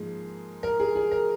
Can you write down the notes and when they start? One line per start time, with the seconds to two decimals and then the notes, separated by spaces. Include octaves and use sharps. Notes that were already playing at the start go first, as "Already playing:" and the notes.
Already playing: G#2 F3 A#3 G#4
0.63 A#4
0.80 G#4
0.96 G#4
1.11 A#4